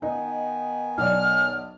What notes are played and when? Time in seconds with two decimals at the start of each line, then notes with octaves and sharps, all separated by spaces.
0.02 D#3 B3 D#4 D#5 G#5
0.98 B1 D5 F6